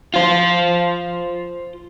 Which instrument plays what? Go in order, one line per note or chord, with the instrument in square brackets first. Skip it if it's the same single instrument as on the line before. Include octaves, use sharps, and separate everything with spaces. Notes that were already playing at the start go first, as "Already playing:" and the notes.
[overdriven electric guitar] F4 C5